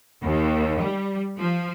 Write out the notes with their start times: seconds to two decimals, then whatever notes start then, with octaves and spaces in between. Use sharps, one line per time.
0.20 D#2
0.80 G3
1.37 F3